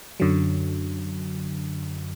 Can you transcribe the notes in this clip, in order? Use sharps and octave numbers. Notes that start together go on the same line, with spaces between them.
F#2 D3 F#3